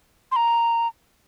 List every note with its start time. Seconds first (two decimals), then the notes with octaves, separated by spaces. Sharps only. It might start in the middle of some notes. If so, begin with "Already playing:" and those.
0.32 C6
0.36 A#5